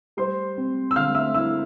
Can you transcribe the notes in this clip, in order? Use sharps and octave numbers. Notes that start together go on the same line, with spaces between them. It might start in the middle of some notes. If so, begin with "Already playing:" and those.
G3 C5 C6
C4
E6
D3 F5 F6
E5 E6
E4 E5 E6